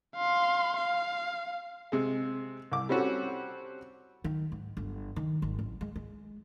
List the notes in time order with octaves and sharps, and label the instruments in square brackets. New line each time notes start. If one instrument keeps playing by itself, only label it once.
[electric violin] F5 C6
F5
[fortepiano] C3 G#3
C2 D6
G3 C4 C#4 F#4 A4
[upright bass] D#3
G#2
G1
D#3
G#1
A1
G#3
G#3